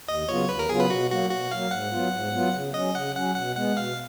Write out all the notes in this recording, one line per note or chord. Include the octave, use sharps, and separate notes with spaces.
D#2 D#5
C#3 F#3 B3 F4 C#5
D#2 B4
A#4
C#3 F#3 B3 F4 G#4
B4
B2 F#4
F#3 A#3 F#4
B2 F#4
F#3 A#3 F5
G#2 F#5
F#3 B3 F4
G#2
F#3 B3 F4
C#3
F#3 C#4 D#5
C#3 F#5
F#3 C#4 F#5
B2 F#5
G#3 B3 F#5
B2 F5